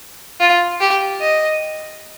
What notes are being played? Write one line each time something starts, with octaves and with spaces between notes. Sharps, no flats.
F4
G4
D#5